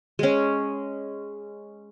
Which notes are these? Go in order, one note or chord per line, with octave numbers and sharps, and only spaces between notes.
G#3 C#4